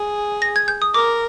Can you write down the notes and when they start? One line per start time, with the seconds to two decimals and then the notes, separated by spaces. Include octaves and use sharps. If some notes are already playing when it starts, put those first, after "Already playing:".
Already playing: G#4
0.42 A#6
0.56 G#6
0.68 G6
0.82 D#6
0.94 A#4 D6